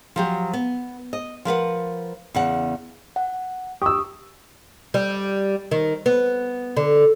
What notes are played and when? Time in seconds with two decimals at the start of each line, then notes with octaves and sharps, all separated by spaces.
0.16 F3 F#3 G4
0.53 B3
1.13 D#5
1.45 F3 A#4 B4 F#5
2.35 E2 C#3 F#5
3.16 F#5
3.82 G4 C#6 D#6 E6
4.94 G3
5.71 D#3
6.06 B3
6.77 D3